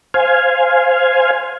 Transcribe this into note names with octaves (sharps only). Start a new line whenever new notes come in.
C5 F5 G#5